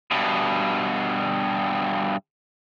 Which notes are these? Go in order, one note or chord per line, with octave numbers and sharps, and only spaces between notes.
G2 B2